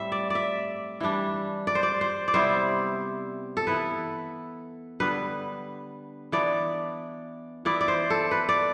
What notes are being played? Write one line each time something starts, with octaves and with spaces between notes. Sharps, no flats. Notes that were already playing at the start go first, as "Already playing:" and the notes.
Already playing: A2 G3 C4 E5
D5
D5 E5
E3 G3 D4
D5
C5
D5
C5
D5
C3 G3 B3 E4 C5
A4
E3 B3 E4 B4
D3 G3 B3 B4
E3 B3 D4 D5
E3 B3 E4 D5
D5
C5
A4
B4
D5